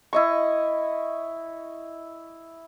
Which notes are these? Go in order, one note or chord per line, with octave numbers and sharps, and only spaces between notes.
E4 D#5 C#6